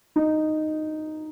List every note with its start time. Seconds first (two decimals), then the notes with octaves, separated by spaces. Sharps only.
0.16 D#4